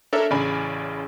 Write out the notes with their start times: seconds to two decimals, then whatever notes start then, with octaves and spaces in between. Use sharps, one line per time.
0.13 D4 A4 A#4 C#5 E5
0.30 A1 C#3 C#4 D5 G#5 B5